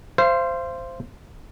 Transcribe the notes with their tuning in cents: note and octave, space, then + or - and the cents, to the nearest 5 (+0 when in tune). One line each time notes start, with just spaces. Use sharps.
C5 +0 F5 -35